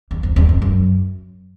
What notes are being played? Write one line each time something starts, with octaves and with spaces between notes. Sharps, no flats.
E2
F2
E2
F2
F#2